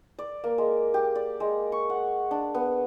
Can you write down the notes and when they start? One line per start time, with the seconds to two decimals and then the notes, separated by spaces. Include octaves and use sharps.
0.19 D5
0.44 A#3
0.58 G#3
0.94 G4
1.15 D5
1.40 G#3
1.72 C#6
1.90 F#5
2.31 D4
2.55 B3